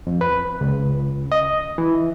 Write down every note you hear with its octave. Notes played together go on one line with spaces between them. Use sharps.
F2
B4
C#2
D#5
E3